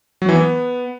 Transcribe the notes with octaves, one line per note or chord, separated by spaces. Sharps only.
F#3
E3
B3